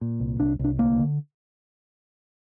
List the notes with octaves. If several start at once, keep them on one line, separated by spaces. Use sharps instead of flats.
A#2
C2
C2 D4
C2 D4
D2 A#3
D3